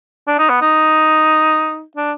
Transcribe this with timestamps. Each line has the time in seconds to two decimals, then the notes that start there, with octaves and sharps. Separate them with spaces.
0.28 D4
0.39 D#4
0.50 B3
0.62 D#4
1.97 D4